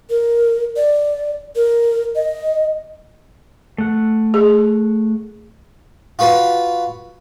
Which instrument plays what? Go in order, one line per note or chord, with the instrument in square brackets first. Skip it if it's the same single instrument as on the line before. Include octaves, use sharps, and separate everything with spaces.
[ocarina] A#4
D5
A#4
D#5
[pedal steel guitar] A3 F#5
[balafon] G#4
[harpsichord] F4 F#4 B4